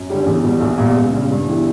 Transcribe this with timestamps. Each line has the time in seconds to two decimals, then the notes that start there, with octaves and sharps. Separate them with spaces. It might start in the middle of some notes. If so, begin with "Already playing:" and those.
Already playing: F#2
0.10 D3 G3 C#4 G4
0.26 E2
0.43 B2 G3
0.60 A#1
0.78 A#2 G3 B3
0.95 C#2
1.13 C#3 G3
1.30 G2
1.47 E3 B3 E4 G4